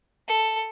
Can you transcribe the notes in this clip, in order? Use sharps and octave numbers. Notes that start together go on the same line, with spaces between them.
A4